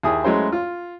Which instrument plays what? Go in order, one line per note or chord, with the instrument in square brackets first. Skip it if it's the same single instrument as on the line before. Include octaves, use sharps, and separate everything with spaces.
[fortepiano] D#2 E4 G#4 D#6
F#3 G#3 A3 C#4 E4 C5
F4